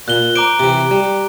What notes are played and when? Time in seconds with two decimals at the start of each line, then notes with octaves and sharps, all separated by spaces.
0.08 A#2 F#6 G7
0.36 C5 A#5 D6 D7
0.59 C3 E3
0.91 G3